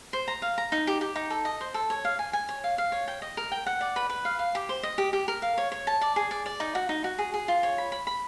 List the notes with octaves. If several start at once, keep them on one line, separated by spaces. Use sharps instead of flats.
C5
A#5
F5
A#5
D#4
G4
G4
D#4
A4
D#5
C5
A4
C#5
F5
G#5
G#5
C#5
F5
F5
C#5
G5
D#5
A#4
G5
F#5
D5
B4
B4
F5
F5
G4
C5
D#5
G4
G4
A#4
F5
C#5
C#5
A5
D5
G#4
D5
D5
D#4
F#4
D#4
F#4
G#4
G#4
F4
C#5
B5
B5
B5